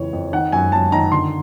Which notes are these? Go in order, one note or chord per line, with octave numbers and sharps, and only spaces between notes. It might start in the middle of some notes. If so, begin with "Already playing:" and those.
Already playing: F2 C#3 E3 C#5
F2
D#3 F#5
F#2 G#5
F#2 A5
D#3 A#5
D3 C6